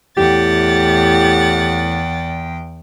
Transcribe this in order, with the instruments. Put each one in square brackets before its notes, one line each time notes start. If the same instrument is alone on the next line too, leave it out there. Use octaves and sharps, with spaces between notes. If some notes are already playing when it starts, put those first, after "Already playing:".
[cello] E2 G5 [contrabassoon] A2 [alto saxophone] G4 [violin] F#5 A6